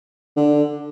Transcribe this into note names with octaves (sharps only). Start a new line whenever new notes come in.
D3